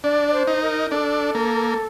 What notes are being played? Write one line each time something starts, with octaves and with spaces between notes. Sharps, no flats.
D4 D5
D5
C5
D#4
A#4
D4 A4
A#3